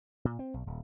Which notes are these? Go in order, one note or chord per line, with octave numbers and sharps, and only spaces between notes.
A#2
C4
B1
D#1